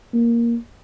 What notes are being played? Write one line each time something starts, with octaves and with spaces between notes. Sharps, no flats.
A#3